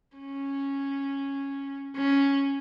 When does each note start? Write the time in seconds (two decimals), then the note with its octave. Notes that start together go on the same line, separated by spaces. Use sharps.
0.18 C#4
1.96 C#4